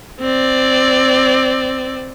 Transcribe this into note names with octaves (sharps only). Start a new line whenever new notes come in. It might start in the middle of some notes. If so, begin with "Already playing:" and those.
C4 D5